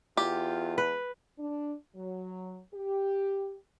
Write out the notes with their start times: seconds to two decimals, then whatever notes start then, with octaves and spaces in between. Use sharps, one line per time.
0.17 E2 F4 G4
0.78 B4
1.38 D4
1.96 F#3
2.74 G4